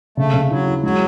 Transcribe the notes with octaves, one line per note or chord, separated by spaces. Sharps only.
C#3 A3
C#3
F#3 E4
E4
F#3 G#3